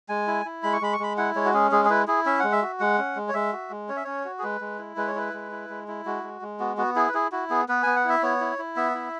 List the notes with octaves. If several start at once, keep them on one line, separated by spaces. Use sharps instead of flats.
G#3 G#5
E4
E4
G#3 B5
C#6
G#3 B5
C#6
G#3 B5
E4 F#5
G#3 C#5
F#4
C#4 G#4
G#3 G#4
G#4
E4 B4
E4 G#4
C#4 E5
G#3 F#5
E5
F#4
G#3 F#5
C#4
G#3
C#5
G#3 E5
F#4
G#3
C#4 C#5
E5
C#4 C#5
F#4
G#4
G#3 B4
G#3
E4
G#3 B4
C#5
E4 B4
G#3
E4
G#3
E4
G#3 F#4
G#3
G#3
B3 F#4
B3 F#4
E4 G#4
B4
E4 G#4
E4 F#4
B3 G#4
B3 B4
B3 G#5
F#5
E4 E5
B3 C#5
E4
E4
B3 E5
E4